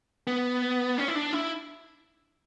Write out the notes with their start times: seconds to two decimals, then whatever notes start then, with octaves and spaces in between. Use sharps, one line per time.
0.27 B3
0.98 C#4
1.08 E4
1.15 D4
1.33 E4